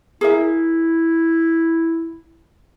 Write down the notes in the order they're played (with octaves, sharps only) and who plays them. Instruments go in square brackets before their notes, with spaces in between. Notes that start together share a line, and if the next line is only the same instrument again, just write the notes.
[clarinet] E4 [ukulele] G#4 A#4 E5